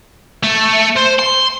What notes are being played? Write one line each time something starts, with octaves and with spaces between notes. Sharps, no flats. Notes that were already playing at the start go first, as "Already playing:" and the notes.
A3
C5
C6